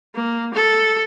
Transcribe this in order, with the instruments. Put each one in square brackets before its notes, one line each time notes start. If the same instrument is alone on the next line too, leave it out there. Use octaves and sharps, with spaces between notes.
[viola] A#3
A4